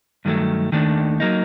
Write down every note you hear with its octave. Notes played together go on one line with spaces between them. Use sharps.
G2 D#3 F#3 A3
D#2 D#3 A3 D4
F#3 A#3 D#4